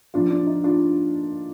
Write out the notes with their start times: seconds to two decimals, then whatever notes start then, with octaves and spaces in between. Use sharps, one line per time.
0.14 A#2 F3 D4 F4
0.30 D4
0.47 D#4
0.64 D4 F4